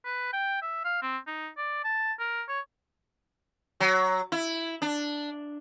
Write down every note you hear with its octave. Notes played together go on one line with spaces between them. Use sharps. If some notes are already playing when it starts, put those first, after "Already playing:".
B4
G5
E5
F5
C4
D#4
D5
A5
A#4
C#5
F#3
E4
D4